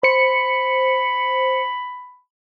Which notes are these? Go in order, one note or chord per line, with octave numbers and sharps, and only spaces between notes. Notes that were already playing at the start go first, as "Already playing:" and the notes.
C5 B5 C#7